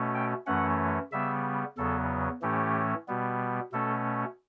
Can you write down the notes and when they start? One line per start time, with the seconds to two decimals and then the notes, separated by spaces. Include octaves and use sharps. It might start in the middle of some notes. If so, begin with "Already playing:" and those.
Already playing: B2 A3 C#4
0.15 G5
0.46 F#2 E3 A3 C#4 F#5
1.12 C#3 G3 B3 E5
1.78 E2 C#3 F#3 B3 A4
2.42 A2 E3 A3 C#4 G4
3.08 B2 G3 B3
3.72 B2 A3 C#4 A4